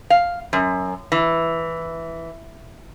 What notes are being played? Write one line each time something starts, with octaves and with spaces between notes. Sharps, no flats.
F5
F#2
E3